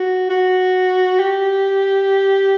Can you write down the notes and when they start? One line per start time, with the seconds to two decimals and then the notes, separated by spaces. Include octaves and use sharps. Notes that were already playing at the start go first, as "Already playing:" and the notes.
Already playing: F#4
0.30 F#4
1.19 G4